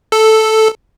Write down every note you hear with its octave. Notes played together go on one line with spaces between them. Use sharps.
A4